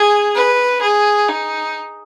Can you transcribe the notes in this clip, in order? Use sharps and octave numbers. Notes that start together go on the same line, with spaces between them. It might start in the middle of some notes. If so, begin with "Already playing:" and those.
Already playing: G#4
B4
G#4
D#4